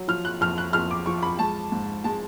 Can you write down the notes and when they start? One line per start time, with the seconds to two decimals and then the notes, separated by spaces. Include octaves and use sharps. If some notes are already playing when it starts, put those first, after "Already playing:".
Already playing: F#3
0.08 F3 F6
0.25 F#6
0.41 F2 F6
0.58 F#6
0.73 F2 F6
0.91 D6
1.06 F3 C#6
1.23 B5
1.39 G#3 A5
1.72 G#2
2.04 G#3 A5